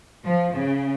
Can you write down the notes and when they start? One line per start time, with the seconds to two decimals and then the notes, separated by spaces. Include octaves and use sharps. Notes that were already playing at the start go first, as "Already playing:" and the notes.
0.24 F3
0.54 C#3